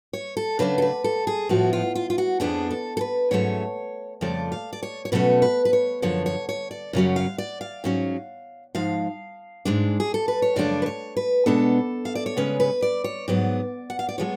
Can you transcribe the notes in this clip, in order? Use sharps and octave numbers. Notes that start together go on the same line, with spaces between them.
C#5
A4
C#3 F#3 A3 D4 B4
A4
B4
A4
G#4
A2 F3 B3 F#4
F4
F4
F4
F#4
F2 F3 B3 D4 G#4
A4
A4
B4
G#2 F#3 A3 C#4 C#5
F2 C#3 F3 A3 D5
F5
D5
C#5
C#5
B2 F#3 A3 C#4 B4
B4
B4
C#5
F#2 D3 F3 C#5
C#5
C#5
D5
F#2 C#3 F#3 C#4
F5
D5
F5
G#2 F#3 C#4
G#2 F3 G#3 F5
G#2 G#3 D4
G#4
A4
B4
C#5
F#2 C#3 F3 A3 D4 D5
B4
C#5
B4
B2 G#3 B3 D4 A4
F5
D5
C#5
C#3 G#3 C#4 B4
B4
D5
C#5
G#2 F#3 B3 D5
F#5
F5
D5
F3 G#3 B3 C#5